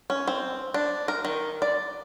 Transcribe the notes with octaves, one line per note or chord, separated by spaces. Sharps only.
C#4
C4
D4
A#4
D#3
D5